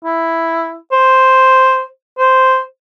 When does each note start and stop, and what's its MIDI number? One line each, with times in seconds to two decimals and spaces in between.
0.05 0.75 64
0.92 1.83 72
2.19 2.60 72